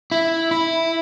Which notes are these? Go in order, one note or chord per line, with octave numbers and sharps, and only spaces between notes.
E4
E4